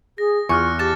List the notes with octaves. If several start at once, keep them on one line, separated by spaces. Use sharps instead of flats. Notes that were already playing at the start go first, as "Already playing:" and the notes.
G#4 A#6
E2 F4 G#4 C#6 F6 F#6 C#7
G4 A5 D6 A6 E7